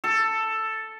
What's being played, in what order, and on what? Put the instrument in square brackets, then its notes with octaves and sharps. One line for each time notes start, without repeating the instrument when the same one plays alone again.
[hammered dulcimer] A4